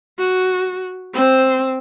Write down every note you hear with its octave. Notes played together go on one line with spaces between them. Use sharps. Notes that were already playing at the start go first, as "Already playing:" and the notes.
F#4
C4 C5